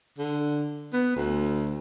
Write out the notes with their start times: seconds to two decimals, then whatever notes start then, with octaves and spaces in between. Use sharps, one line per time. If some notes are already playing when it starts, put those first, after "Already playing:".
0.18 D3
0.93 B3
1.16 D2